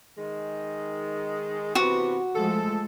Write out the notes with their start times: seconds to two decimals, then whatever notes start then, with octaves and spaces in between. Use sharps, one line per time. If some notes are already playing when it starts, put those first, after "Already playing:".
0.18 D#3 G#3
1.75 C3 E3 B3 F#4
2.35 F3 G#3 A3 A4